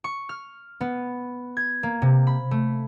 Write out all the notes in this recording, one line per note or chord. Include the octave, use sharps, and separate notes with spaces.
C#6
F6
B3
G#6
A#3
C3
B5
A3